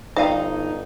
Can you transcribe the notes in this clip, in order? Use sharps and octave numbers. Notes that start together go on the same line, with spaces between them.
G1 D#4 C5 D5 F5 G5